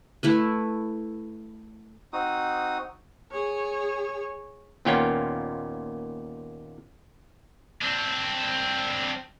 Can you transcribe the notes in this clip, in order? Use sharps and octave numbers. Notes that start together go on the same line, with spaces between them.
A3 E4 B4
C4 D#4 F#4 D#6
G#4 C#5
D#2 A#2 B3 C#4 F4 G5
C4 D4